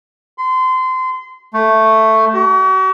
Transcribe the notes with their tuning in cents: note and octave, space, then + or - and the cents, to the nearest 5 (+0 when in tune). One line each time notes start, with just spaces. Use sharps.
C6 -25
A3 +5
F#4 +40